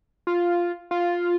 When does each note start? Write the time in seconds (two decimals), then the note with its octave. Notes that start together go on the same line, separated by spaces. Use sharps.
0.27 F4
0.91 F4